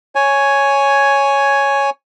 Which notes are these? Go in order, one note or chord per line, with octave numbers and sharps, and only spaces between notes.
C#5 G#5